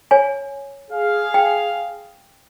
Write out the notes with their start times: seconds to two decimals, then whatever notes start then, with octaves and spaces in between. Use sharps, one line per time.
0.11 C#5 G#5
0.91 G#4 F5
1.34 G5